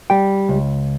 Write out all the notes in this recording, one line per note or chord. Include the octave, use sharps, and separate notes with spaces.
G3 G5
C#2